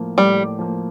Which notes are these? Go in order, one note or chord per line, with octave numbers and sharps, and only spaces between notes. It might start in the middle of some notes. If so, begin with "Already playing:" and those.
Already playing: A2 F3 A#3
A2 G3
F3 A#3